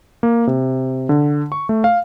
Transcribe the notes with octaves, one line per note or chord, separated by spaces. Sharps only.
A#3
C3
D3
C#6
A3
F5